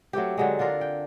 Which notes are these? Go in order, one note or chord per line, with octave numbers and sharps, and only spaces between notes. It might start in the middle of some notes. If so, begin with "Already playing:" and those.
F#3 A3 C4 G4
D3 F#3 G#3
D4 F4 A4 A#4
G5